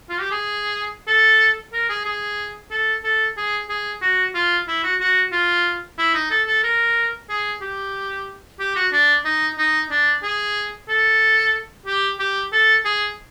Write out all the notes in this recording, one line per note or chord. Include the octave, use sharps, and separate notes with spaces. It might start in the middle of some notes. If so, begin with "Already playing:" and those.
F4
G4
G#4
A4
A#4
G#4
G#4
A4
A4
G#4
G#4
F#4
F4
E4
F#4
F#4
F4
E4
D#4
A4
A4
A#4
G#4
G4
G4
F#4
D4
D#4
D#4
D4
G#4
A4
G4
G4
A4
G#4